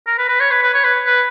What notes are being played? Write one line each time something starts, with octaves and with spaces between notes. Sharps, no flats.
A#4
B4
B4
C#5
B4
B4
C#5
B4
B4